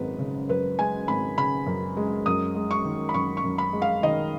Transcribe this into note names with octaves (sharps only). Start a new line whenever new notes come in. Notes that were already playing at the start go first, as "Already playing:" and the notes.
Already playing: G#1 F#2 G#3 B4
C#3
F#2 B4
G#3 G#5
G#1 B5
C#3 B5
F#2
G#3
F#2 D#6
G#3
C#6
D#3
B5
F#2 C#6
C#6
F#2
B5
G#3
F5
D#3 D#5